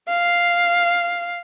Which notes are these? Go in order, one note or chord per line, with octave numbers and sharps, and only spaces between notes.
F5